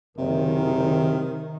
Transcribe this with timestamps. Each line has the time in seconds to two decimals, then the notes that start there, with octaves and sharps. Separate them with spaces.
0.18 F#1 C3 D#3 A#4